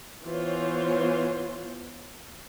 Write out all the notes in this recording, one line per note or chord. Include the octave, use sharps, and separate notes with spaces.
E3 B3 F4 C5 C#5